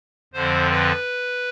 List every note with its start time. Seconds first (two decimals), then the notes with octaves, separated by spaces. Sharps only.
0.34 F2 D3 F3 C4 C5
0.70 B4